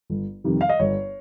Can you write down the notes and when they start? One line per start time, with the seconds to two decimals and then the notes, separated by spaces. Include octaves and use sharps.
0.10 G1
0.44 F2 C3 D#3 G3
0.61 F5
0.69 D#5
0.80 G1 C#5